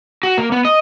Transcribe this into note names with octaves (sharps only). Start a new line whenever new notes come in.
F#4
A#3
B3
D#5